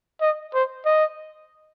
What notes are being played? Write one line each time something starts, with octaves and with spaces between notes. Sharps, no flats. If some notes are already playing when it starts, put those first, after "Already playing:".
D#5
C5
D#5